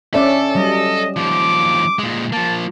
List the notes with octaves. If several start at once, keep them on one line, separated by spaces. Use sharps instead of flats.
C#4 A4 D5 E5
F#3 G3 D#5
D#2 F3 D6
A#2 G#3
F3 A#3 A5